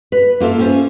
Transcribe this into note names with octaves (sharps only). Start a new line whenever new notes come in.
B4
A#3 F4 A4 E5
C#4 F4 C5